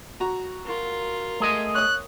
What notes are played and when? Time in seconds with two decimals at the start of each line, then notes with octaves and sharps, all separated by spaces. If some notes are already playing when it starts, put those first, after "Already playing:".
0.20 F#4 A#5
0.66 F4 A#4
1.40 A3 G#4 D#5
1.75 C#5 D#6 F#6